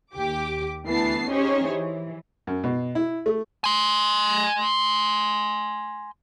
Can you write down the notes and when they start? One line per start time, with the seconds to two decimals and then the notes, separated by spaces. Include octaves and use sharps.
0.13 D#2 G4 D6
0.86 D2 E3 B3 A5 C7
1.28 C#4 D#4 G4 G#4 C5 C#5
1.68 E3
2.47 F#2
2.64 B2
2.95 E4
3.26 A3
3.64 G#5 C6